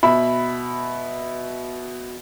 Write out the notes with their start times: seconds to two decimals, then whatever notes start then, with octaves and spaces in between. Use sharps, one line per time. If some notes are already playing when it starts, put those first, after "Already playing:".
0.03 B2 E5 B5